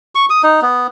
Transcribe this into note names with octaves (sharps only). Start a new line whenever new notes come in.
C#6
D#6
D#4
B3